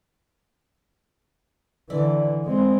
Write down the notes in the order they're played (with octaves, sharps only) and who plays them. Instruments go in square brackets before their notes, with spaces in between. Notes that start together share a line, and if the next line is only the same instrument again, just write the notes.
[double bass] D3 E3 [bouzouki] D5 E5
[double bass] G#3 C4